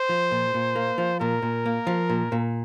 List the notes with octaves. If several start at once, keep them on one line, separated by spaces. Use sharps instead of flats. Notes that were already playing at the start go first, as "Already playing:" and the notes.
Already playing: C5
F3
A#2
A#2
A#3
F3
A#2 A#4
A#2
A#3
F3
A#2
A#2